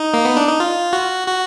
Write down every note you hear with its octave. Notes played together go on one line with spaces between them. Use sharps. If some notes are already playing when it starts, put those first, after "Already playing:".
Already playing: D#4
A#3
B3
D4
D#4
F4
F#4
F#4